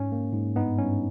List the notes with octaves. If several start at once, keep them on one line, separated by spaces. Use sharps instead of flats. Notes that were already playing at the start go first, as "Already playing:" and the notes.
Already playing: G#2 C#4
A#3
G#2
G2 B3 D#4
G2 C#4